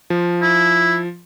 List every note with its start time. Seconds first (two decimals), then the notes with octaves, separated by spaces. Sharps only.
0.10 F3
0.42 E4